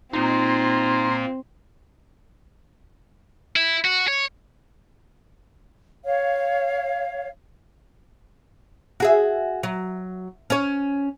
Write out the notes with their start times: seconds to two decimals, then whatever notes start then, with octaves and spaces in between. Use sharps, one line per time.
0.13 A#2 A#3 C4 D#4 F4 A#5 C6
3.56 E4
3.85 F#4
4.08 C#5
6.05 C#5 F5
9.00 F#4 G#4 E5
9.63 F#3
10.50 C#4 C#5